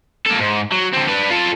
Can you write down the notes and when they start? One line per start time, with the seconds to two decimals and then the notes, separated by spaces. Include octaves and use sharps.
0.26 A#3 A4
0.40 G#2
0.72 F#3
0.93 D3 C4
1.08 D4 B4
1.31 F4 A4